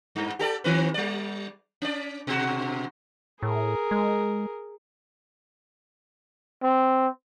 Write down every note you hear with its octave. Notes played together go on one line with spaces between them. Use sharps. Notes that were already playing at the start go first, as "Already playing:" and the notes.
G2
G4 A4 D5
D#3 C4 B4
G3 D5
C#4 D5
B2 F#4
A2 G#4 A#4
G#3
C4